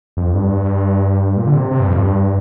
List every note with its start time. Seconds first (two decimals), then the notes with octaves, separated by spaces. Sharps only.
0.17 F2
0.34 G2
1.37 A#2
1.47 D3
1.54 C3
1.71 C3
1.80 G2
1.88 F2
1.96 G2